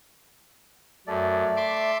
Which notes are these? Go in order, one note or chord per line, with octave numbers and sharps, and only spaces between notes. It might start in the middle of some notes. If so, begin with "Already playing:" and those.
F#2 A3 D5
E5 C6 D6